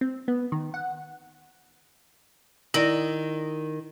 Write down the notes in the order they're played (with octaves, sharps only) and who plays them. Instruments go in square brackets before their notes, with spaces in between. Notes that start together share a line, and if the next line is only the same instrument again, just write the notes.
[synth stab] C4
B3
D#3
F#5
[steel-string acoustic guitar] D#3 [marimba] E4 D5 A#6